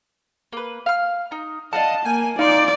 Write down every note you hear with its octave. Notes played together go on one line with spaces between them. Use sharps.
A#3 B4
F5 F6
D#4 A#5
D4 D#5 F5 F#5 A5
A#3 G5 G#5
D#4 D5 F5 C6